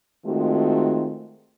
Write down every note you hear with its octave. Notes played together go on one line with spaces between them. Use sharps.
D#3 G#3 A3 C4 F4 F#4